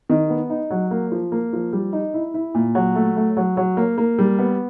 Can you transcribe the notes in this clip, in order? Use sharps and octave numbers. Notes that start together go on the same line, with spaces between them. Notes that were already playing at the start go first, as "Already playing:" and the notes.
D#3
B3
D#4
F#3
A#3
F3
A#3
F3
G3
D#4
E4
E4
A#2
F#3
A3
A3
F#3
F#3
A#3
A#3
G3
B3